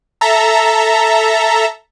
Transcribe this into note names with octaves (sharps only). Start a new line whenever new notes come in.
A4 E5 A#5